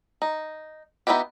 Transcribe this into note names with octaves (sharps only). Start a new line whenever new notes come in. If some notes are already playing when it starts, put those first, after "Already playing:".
D#4
B3 D#4 E4 F#4 G4